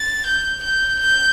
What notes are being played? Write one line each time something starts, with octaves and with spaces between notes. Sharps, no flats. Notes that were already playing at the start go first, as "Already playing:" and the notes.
Already playing: A6
G6
G6
G6